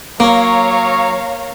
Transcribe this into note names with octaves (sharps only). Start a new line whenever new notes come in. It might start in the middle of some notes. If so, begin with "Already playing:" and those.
F#3 A#3 C#5 F5 A#5